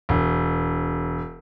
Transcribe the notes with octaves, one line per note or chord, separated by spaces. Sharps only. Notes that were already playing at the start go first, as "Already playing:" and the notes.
E1